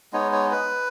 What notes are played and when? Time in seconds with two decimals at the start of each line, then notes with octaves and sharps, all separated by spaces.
0.13 G#3 B3 D#4 C#5
0.33 C#5
0.52 B4